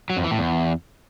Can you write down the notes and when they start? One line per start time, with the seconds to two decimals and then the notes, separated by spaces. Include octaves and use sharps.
0.10 F#3
0.17 F2
0.24 E3
0.31 A2
0.38 E2